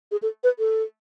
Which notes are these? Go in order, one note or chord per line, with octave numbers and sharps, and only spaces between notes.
G#4
A4
B4
A4